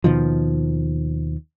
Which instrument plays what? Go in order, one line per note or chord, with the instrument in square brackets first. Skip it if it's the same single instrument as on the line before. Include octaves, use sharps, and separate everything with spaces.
[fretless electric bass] D#2 B2 D#3 F3